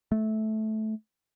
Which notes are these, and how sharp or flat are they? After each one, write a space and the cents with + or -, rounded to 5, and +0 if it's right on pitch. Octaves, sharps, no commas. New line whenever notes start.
A3 -15